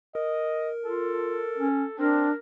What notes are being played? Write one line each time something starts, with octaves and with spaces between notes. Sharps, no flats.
A#4 D#5
F4 A4
C#4
C4 D4 A#4